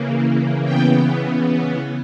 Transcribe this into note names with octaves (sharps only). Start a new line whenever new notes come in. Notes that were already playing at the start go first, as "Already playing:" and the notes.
Already playing: C#3 E3 A#3
C#3 E3 B3 G5